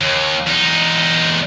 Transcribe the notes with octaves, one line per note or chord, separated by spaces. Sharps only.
D#2
E2 D#4